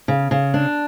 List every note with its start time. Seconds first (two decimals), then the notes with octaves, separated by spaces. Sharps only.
0.08 C#3
0.31 C#3
0.54 D4